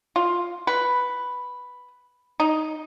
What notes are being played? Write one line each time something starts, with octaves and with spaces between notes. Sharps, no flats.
F4
B4
D#4